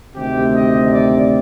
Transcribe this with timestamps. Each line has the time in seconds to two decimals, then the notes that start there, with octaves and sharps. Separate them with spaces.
0.16 D2 C3 D#3 G4
0.53 D#5
0.90 D5